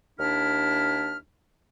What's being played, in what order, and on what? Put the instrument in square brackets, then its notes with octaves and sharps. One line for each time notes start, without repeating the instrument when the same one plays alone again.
[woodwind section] D#2 D4 E4 F6